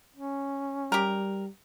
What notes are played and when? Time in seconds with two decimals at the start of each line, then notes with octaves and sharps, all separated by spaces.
0.16 C#4
0.92 G3 G4 A#4